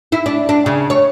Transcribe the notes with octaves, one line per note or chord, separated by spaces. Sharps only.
E4
D4
D4
C#3
C#5